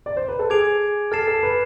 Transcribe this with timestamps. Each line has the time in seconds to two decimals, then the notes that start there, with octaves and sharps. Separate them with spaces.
0.06 D5
0.17 C5
0.28 B4
0.39 A4
0.50 G#4 G#5 D6 G#6 D7 F7
1.12 A4 F6 A6 C7 E7
1.28 A4
1.43 B4